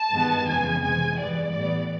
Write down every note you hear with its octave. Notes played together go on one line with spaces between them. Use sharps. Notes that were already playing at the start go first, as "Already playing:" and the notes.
Already playing: A5
G2 D#3 G#3 B3
F2 C#3 E3 G#3 B3 G#5
C3 E3 G#3 G#5
G2 E3 G#3 B3 D5
A2 E3 G3 B3